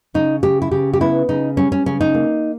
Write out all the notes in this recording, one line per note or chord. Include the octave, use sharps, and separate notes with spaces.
C#3 D#4
C#3 G4
E4
C#3 G4
G4
B3 E4
C#3 D#4
G3 C#4
C#4
C#3 C#4
D#4
A#3